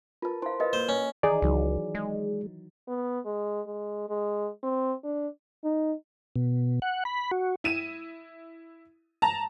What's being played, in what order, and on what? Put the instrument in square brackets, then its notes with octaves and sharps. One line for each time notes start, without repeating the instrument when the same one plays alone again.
[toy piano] F4 B4 [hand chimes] A#4 A5
[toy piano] E4 F5 [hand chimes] C5 C6
[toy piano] A#4 D#5 F5 [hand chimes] B4
[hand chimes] A#3 [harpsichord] C5
[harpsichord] C#4
[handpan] D#3 E3 [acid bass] D#4 [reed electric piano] G#4 D5
[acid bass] C#2 [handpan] E3 F#3 D#4
[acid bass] G#3
[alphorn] B3
G#3
G#3
G#3
C4
D4
[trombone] D#4
[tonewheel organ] B2
F#5
B5
F#4
[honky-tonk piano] E4 D#7 E7
A5 A#5